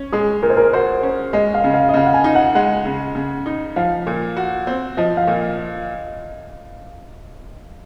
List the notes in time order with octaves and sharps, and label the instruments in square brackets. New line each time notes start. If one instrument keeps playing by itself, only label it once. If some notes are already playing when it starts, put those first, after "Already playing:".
Already playing: [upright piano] C#4
[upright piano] G#3 [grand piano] G#4
[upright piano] A#2 [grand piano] A#4
[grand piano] C5
A#4
[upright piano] F#4 [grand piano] C5
[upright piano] C#4
[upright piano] G#3 [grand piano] D#5
[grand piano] F5
[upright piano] C#3
[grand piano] F5
D#5
[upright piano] C#3 [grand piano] F5
[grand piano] F#5
G#5
[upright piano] D#4
[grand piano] F#5
[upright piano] G#3 [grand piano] F#5
[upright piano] C#3
C#3
D#4
[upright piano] F3 [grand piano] F5
[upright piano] A#2
F#4
C4
[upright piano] F3 [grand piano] D#5
[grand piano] F5
[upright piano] A#2